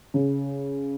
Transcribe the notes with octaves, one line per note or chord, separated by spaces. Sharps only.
C#3